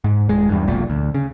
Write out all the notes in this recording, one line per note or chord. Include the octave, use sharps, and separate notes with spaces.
G#2
D#1 G#3
E2 G2
F1 B1 A#2
D2
C#3